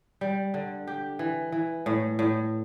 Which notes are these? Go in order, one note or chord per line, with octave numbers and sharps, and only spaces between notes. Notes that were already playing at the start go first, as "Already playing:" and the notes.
G3
D3
G4
E3
E3
A2
A2